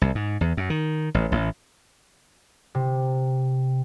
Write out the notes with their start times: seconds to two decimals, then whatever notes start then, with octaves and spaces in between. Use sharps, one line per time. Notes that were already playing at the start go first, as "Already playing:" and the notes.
0.02 C2
0.15 G#2
0.41 E2
0.57 F#2
0.70 D#3
1.14 A1
1.32 A1
2.75 C3